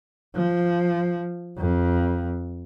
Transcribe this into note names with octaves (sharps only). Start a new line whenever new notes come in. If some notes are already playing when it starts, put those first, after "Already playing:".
F3
F2